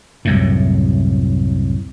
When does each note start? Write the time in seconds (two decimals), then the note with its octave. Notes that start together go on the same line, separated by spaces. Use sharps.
0.25 C2 F#2 A2